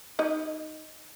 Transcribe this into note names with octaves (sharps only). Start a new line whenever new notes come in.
D#4 D#5